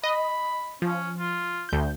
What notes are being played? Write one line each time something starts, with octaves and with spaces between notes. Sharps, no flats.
D#5 B5
F3 C#4
F4
D2 G6